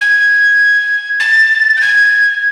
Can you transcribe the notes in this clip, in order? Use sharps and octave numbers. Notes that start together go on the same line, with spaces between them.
G#6
A6
G6
G#6